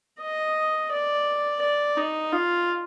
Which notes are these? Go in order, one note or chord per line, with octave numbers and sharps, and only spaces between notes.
D#5
D5
D5
D#4
F4